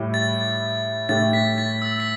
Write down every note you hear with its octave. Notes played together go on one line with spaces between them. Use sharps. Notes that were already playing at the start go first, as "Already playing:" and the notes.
Already playing: A2 G3 E4 G4
A6
A2 A3 G4 A6
B6
A6
E6
B6